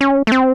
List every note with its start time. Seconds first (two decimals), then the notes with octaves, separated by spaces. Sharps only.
0.01 C#4
0.27 A3
0.32 C4